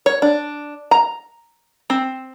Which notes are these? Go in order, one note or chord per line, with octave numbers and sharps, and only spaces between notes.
C#5
D4
A#5
C4